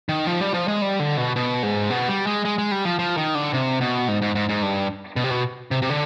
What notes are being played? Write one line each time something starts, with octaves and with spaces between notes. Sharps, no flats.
D#3
F3
G3
F3
G#3
G3
D3
B2
B2
G#2
B2
G3
G#3
G#3
G#3
G3
F3
F3
D#3
D3
C3
B2
G#2
G#2
G#2
G#2
G2
B2
C3
B2
C3
C3
D3